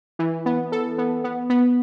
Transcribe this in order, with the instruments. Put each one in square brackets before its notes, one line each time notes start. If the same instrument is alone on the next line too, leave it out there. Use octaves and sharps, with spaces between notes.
[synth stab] E3
B3
A4
B3
B3
B3